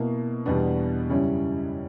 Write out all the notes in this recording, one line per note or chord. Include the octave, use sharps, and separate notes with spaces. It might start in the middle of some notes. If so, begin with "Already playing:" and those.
Already playing: B2 A#3 E4
E2 B2 G3 B3 D4
F#2 C#3 G3 C#4 E4